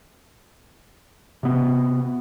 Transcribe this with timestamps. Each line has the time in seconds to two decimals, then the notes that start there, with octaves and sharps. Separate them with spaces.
1.43 C3 B3